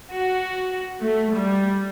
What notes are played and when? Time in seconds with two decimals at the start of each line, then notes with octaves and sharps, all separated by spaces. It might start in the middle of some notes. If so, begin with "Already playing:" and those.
0.14 F#4
1.01 A3
1.32 G3